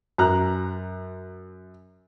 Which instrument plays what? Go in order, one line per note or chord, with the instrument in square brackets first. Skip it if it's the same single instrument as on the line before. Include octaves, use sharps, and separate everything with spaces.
[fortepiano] F#2 A#5 F#6